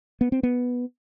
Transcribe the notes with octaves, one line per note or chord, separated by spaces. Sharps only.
B3
C4
B3